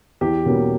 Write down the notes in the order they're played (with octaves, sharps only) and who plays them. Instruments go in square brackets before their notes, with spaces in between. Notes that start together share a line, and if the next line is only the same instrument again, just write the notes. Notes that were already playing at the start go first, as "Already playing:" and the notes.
[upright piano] E2 [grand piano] G4
[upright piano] B2 G3 A#3 C#4